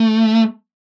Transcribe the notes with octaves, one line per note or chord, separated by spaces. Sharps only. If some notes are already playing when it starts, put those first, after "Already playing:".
Already playing: A3